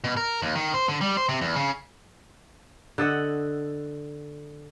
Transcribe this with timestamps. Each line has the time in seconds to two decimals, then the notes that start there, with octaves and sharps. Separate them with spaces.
0.04 B2
0.17 A#4
0.42 D#2
0.55 D#3
0.74 C5
0.89 D3
1.01 G3
1.17 C5
1.29 C3
1.41 E2
1.56 C#3
2.98 D3 A4 D#5 F#5